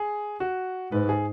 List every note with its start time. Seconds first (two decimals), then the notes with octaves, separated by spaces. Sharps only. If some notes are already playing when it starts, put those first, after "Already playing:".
Already playing: G#4
0.40 F#4
0.92 G#2 B4
1.09 G#4